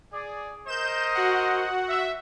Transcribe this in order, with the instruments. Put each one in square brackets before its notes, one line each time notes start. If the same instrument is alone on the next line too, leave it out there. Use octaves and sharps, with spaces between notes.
[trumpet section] G#4 D5
[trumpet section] A#4 C5 D#5 [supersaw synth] G6 E7
[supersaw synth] F#4 F#5
[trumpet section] E5